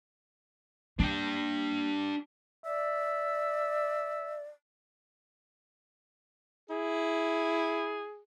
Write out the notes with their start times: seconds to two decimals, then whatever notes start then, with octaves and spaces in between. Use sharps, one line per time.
1.00 A#3 D4 G5
2.64 D5 E5
6.70 E4 G#4